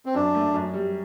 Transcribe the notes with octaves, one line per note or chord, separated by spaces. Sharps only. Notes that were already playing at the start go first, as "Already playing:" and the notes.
C4
F#2 D4
A3
F#2
G3